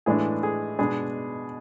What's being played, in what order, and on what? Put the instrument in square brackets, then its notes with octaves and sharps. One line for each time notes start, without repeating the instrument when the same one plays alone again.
[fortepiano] A2 E3 G#3 D4 G#4
G#4
B2 G#3 D4 G#4